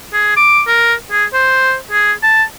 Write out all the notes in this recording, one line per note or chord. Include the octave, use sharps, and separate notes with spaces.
G#4
D6
A#4
G#4
C5
G#4
A5